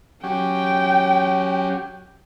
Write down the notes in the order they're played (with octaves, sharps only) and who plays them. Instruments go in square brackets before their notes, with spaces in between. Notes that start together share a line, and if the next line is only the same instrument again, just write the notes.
[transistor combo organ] F#3 C#4 G4 [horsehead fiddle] G5